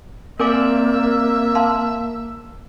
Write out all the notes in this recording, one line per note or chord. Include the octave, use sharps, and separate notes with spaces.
A#3 C4 A#4 D5 E5 G#5 D6
F5 A5 C6